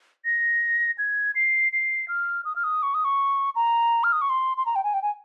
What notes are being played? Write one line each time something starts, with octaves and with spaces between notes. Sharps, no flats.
A#6
G#6
C7
C7
F6
D#6
F6
D#6
C#6
D#6
C#6
A#5
F6
D#6
C#6
C6
C6
A#5
G5
G#5
G5
G#5